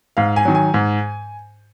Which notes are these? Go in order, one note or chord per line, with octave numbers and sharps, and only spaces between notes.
G#2 F5
G#5
D#3 F#3
G#5
G#2